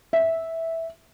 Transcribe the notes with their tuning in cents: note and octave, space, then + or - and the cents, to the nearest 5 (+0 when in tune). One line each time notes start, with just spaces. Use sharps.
E5 -10